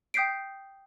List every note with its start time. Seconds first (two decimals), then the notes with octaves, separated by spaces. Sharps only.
0.14 G5 D#6 G6 B6 C7 D7